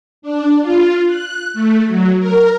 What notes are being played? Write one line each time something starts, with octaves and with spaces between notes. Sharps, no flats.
D4
F4
F#6
A3
F#3
A#4